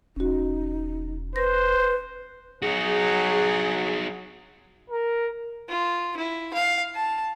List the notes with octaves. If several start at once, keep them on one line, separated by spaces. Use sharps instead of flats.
E1 C#4 D#4 F#4
B4 C5 A#6
F#3 D#4 F#4 G#4
A#4
F4
E4
F5
A5